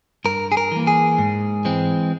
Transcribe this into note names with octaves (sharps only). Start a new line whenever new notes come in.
G2 A#4
G#4
A#4
E3 A#3
G#4
G#2
E3 G#3 C4